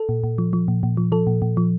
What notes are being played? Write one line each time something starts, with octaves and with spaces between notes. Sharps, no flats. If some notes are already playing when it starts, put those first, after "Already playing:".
Already playing: A4
A#2
A#2
F3
F3
A#2
A#2
F3
F3 A4
A#2
A#2
F3